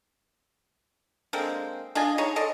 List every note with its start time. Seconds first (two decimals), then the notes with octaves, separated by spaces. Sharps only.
1.33 D3 G#3 A#3 C4
1.95 D4 F4 D#5 G#5
2.18 D#4 G#4 C#5 D#5
2.36 A4 D5 D#5 C6